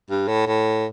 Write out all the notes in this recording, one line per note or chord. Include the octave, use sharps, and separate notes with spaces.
G2
A2
A2